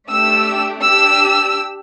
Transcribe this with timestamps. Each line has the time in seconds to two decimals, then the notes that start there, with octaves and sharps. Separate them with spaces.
0.09 A3 D4 G4 E6
0.81 D4 G4 E6